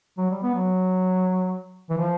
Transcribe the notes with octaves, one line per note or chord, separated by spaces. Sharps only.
F#3
G3
B3
F#3
E3
F3